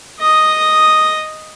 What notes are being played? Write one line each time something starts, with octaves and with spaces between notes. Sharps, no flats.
D#5 D#6